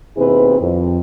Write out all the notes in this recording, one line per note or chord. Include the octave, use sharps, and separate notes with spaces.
D#2 B2 C4 E4 G#4 B4
F2